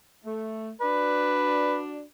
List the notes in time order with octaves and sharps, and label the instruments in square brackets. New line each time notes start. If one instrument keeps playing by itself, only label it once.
[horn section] A3
[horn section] D4 F#4 D5 [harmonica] B4